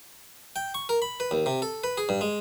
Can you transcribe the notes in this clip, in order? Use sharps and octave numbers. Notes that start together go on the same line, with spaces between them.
G5
C#6
A#4
B5
B4
D#2
C3
A4
B4
G#4
G2
G#3